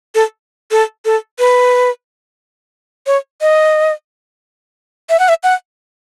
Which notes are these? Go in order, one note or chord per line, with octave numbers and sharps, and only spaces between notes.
A4
A4
A4
B4
C#5
D#5
E5
F#5
E5
F#5